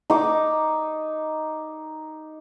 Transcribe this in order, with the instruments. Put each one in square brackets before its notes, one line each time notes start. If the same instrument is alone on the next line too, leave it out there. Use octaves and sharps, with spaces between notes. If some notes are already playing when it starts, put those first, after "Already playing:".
[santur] D#4 D6